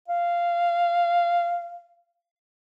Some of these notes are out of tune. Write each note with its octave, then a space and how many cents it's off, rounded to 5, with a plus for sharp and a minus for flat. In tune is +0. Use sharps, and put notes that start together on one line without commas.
F5 -10